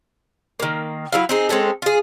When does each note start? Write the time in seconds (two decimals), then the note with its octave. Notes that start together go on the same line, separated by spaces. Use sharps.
0.60 D#3 A#3
1.12 F#3 E4 F5
1.29 C4 D#4 G#4
1.49 G#3 C4 C#4 A4
1.82 F4 G#4